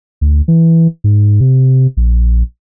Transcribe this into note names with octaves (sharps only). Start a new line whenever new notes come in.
D2
E3
G#2
C3
A#1